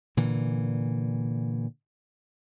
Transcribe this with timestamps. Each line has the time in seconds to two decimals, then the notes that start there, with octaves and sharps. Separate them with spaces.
0.17 A#2 D3 E3